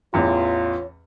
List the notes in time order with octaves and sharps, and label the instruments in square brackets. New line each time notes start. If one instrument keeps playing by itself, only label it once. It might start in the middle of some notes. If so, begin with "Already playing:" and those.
[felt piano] A1 E2 [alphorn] F4 [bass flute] C#5